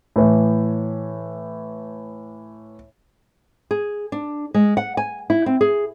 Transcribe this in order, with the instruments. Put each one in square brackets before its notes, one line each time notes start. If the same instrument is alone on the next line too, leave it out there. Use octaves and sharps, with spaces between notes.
[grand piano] A2 E3
[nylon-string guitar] G#4
D4
G#3
F#5
G#5
E4
C4
G#4